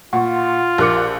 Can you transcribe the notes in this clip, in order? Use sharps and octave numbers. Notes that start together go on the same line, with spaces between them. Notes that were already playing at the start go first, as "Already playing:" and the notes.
A#2 F4 F#5 C#6
A#1 G4 A#4 D6 F#6 C#7